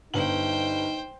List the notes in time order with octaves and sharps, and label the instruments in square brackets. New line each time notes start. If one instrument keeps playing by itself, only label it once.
[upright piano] G1 G2 F#7 [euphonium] D#4 [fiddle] C5 G5